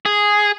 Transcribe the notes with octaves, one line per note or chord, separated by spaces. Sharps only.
G#4